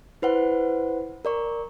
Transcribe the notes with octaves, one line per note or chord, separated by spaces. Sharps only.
E4 B4 C5 F#5
A#4 D5 C#6